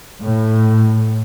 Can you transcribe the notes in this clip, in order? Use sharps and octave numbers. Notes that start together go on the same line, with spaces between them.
A2